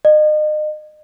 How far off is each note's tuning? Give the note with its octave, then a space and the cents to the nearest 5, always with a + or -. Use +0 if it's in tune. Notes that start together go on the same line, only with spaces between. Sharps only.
D#5 -35